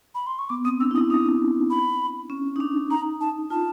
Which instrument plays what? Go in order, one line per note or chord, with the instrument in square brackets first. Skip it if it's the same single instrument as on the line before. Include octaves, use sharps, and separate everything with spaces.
[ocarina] B5
C6
C#6
[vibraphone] B3 [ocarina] D6
[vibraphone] C4 [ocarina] D#6
[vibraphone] D4 [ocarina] E6
[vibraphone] E4
[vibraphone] D#4 [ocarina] D#6
[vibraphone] D4 [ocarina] D#6
[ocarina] B5
[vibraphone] C#4
D#4
D4
[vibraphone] D#4 [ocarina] A#5
[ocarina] A5
[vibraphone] F4 [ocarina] A5